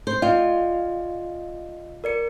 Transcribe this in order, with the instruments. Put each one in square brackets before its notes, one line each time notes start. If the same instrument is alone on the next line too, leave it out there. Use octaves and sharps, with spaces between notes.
[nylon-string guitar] C5
[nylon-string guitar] F4 [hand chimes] D5 D#5 G5
[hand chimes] A#4 D5 C#7